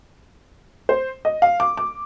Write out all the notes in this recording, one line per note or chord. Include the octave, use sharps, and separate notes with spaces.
C5
D#5
F5
D6
D6